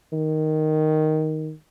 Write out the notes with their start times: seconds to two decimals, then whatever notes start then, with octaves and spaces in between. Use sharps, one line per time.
0.13 D#3